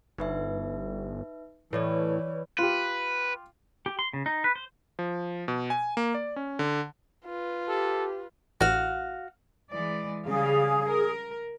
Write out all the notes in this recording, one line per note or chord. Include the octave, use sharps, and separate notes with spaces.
G1 D#4 B4 E5
A2 E3 B4 C#5 D5
F4 G4 B4
G4
C6
C#3
D#4
B4
C5
F3
B2
G#5
A#3
D5
C#4
D3
F4 B4
G4 A4
A1 F#4 F5
E3 G#3 D5
C#3 G3 G#4 F5
A#4